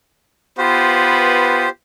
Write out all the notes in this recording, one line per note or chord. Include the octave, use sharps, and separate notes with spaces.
B3 F4 G4 B4 C5